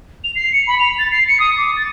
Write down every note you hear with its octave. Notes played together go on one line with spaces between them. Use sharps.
F7
C7
C#7
B5
F7
A6
C7
C#7
D#6
D6
A6